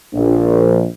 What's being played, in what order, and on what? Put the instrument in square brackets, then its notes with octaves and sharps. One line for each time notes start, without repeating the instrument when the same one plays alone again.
[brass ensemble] A#1